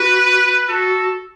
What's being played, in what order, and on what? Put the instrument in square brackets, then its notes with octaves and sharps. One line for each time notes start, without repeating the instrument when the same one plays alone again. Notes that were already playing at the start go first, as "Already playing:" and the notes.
Already playing: [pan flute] F#4 [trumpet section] B4
[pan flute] F#4 [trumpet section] A4